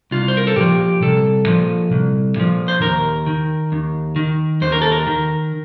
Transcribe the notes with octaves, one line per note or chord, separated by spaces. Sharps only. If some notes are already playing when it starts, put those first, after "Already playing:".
C2 F4
C5
A#4
A4
A#2 F3 G4
C2 A4
A#2 F3
C2
A#2 F3
C5
D#2 A#4
D#3
D#2
D#3
D#2 C5
A#4
A4
A#4
D#3